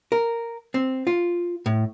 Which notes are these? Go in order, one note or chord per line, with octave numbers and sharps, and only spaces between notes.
A#4
C4
F4
A2